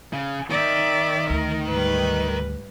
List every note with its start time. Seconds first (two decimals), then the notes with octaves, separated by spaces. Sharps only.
0.13 C#3
0.50 D#3 D5 E5
1.30 D2 A#4
1.67 G#2 G3 B4